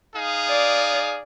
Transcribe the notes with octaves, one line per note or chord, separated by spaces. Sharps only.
D#4 G#4 F5
D5